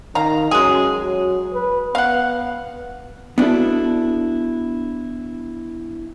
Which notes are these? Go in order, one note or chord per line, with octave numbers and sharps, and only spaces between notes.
D#3 F5 A#5
F#2 G#3 G#4
F#3
B4
B3 F5 F#5
B3 D4 E4 F#4 A4